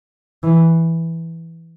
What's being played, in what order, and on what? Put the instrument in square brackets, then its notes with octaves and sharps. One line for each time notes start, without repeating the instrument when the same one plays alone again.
[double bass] E3